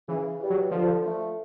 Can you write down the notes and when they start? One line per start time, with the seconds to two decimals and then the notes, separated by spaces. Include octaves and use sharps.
0.08 C#3 E3
0.39 E3 G3
0.50 F#3
0.71 D3 F3
1.02 F3 A3